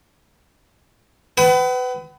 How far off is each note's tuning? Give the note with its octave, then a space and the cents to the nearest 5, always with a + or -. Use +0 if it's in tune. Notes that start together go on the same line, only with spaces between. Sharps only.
B4 +25 F#5 +45 D#6 +45